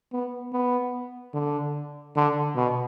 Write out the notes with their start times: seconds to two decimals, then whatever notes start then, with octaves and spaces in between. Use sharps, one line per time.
0.13 B3
0.53 B3
1.34 D3
2.16 D3
2.56 B2